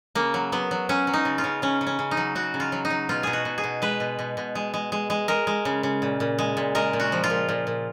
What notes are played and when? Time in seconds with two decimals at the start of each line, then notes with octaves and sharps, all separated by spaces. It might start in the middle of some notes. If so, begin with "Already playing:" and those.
0.15 C#3 A#3
0.34 F#3
0.52 F#3 B3
0.71 F#3
0.89 F#3 C#4
1.07 F#3
1.13 D#4
1.25 C#3
1.38 F4
1.44 C#3
1.62 C#3 C#4
1.81 C#3
1.87 C#4
1.99 C#3
2.11 D#4
2.17 F#3
2.35 C#3 F#4
2.54 C#3
2.60 F4
2.72 F#3
2.85 D#4
2.90 F#3
3.09 B2 F4
3.23 B2 G#4
3.33 F#4
3.45 B2
3.58 G#4
3.64 B2
3.82 G#3 B4
4.00 B2
4.19 B2
4.37 B2
4.55 G#3
4.74 G#3
4.92 G#3
5.10 G#3
5.28 G#3 A#4
5.47 G#3
5.65 C#3
5.83 C#3
6.02 A#2
6.20 A#2
6.39 G#3
6.57 A#2
6.75 G#3 A#4
6.93 A#2
7.00 F#4
7.12 F3
7.24 F4
7.30 A#2
7.49 A#2
7.67 A#2